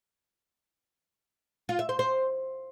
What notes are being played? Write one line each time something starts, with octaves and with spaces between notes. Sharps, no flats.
F4
E5
C5
C5